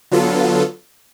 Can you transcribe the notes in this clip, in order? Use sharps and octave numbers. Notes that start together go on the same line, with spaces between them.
D3 F#3 B3 F4 A4